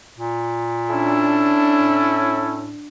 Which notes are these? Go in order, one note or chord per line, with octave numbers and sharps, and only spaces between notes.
A#2
C#4 D4 E4 A4
A2